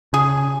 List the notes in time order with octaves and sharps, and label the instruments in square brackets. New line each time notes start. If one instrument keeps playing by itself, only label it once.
[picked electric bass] C#3 [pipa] G#4